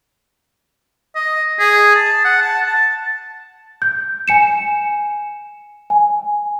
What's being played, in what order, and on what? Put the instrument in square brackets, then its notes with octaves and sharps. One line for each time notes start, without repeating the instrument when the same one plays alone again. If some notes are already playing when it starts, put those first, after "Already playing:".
[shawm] D#5
G#4
A5
F#5
A5
A5
[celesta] G6
G#5 C#7 E7
G#5